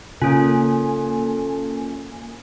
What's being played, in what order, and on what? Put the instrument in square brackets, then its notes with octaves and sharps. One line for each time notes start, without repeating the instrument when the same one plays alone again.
[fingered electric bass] C#3 [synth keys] A#3 G#5 [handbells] C#4 F4 [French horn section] A4